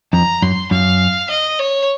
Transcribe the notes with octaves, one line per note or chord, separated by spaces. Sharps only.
F2 A#5
F#2 C6
F#2 F5
D#5
C#5